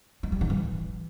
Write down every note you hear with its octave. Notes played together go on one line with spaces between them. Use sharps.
G#3
G3
D#3
E3